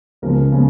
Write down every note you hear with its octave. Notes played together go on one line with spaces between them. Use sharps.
C#2 C#3 F3 G#3 A#4
C#3 F3 G#3